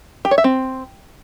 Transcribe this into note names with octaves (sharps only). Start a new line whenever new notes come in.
G4
C#5
E5
C4